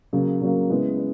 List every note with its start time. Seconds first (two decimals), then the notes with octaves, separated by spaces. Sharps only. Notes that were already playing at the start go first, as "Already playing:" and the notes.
0.13 C#3 F#3 A#3
0.41 C#3 F#3 A#3
0.70 C#3 G#3 B3 E4 B4
0.98 B4